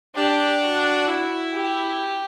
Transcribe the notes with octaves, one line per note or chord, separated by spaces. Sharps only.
D4 G4
F#4
E4
G4